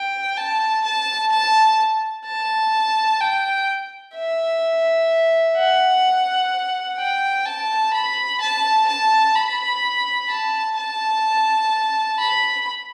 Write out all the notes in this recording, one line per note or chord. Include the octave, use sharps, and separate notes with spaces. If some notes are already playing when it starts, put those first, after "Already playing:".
Already playing: G5
A5
A5
A5
A5
G5
E5
F#5
G5
A5
B5
A5
A5
B5
A5
A5
B5